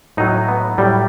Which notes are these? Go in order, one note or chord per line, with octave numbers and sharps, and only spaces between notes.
A2 F#3 D#4
B3
A2 F#3 G3